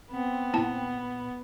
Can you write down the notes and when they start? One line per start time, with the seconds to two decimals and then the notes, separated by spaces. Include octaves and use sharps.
0.11 B3 C4
0.54 A#2 A#3 E4 F#5 A5